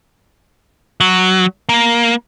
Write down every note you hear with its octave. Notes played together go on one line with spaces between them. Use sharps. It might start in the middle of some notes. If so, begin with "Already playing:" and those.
F#3
A#3